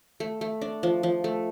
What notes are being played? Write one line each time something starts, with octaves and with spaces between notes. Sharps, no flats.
A3
A3
D4
F3
F3
A3